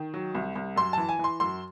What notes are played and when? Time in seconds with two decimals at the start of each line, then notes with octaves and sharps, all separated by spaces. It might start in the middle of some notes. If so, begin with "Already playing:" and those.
Already playing: D#3
0.14 F#3
0.35 C2
0.55 C2
0.76 F#2 C6
0.93 E3 A5
1.09 G#5
1.19 E3 C6
1.40 F#2 C6